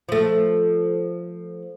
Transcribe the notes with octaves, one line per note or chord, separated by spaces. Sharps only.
F3 A3